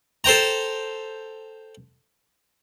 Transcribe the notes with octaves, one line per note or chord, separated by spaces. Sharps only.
A4 C5 G5 A#5